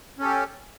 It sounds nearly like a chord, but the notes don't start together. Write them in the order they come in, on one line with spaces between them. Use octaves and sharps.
C#4 A4 G4